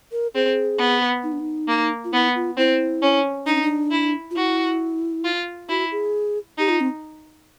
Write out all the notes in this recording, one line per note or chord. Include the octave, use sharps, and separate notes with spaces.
A#4
C4 G#4
B3
D#4
D4
D#4
A#3
F4
B3 E4
F4
C4 E4
C#4
D4 D#4
C#4
D4
E4
F4
E4 F#4
F4
E4 F#4
G#4
D#4 G4
F4
C4